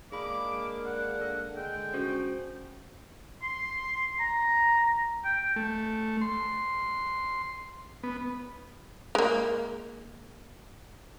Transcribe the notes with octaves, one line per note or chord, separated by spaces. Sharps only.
G#3 A#3 D4 G#4 B5 D6
F#5
A4
D3 G#3 G5
C#4 F#4 C5
C6
A#5
G5
A3
C6
B3
G#3 A#3